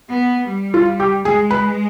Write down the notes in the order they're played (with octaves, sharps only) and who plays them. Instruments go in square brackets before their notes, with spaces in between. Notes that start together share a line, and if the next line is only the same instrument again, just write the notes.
[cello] B3
G3
[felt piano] F4
G4
[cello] G#3 [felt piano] G#4
[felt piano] B4